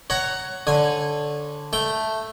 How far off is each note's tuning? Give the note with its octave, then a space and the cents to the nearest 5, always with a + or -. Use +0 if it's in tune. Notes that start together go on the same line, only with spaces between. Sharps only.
C#5 +0 F#5 +15 A#5 +0
D3 +0 C#5 -20 G#5 -10
A3 +0 G5 +0